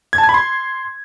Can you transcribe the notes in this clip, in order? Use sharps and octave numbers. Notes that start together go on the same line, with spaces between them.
G#6
A5
G#6
B5
C6